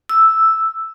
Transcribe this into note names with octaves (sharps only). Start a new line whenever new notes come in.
E6